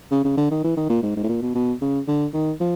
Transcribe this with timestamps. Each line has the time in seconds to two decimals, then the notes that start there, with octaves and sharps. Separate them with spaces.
0.11 C#3
0.24 C#3
0.37 D3
0.51 D#3
0.64 E3
0.77 D#3
0.89 A#2
1.03 G#2
1.16 G#2
1.23 A2
1.29 A#2
1.42 B2
1.55 B2
1.81 C#3
2.08 D3
2.34 D#3
2.60 F3